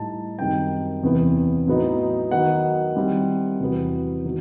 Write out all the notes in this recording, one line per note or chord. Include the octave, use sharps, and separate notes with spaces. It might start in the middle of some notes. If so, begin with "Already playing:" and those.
Already playing: A2 G3 D#4 A5
F#2 D#3 G3 C4 D#4 G5
E2 C3 E3 B3
A2 F#3 B3 D#4
D#3 F#3 B3 D#4 F#5
D#3 G3 C4 E4
E2 C3 F#3 B3
D#3 F#3 B3